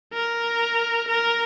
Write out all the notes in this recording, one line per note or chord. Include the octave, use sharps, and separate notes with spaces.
A#4
A#4